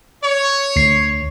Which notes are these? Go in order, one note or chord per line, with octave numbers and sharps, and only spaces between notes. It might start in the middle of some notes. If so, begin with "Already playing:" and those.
C#5
D2 C7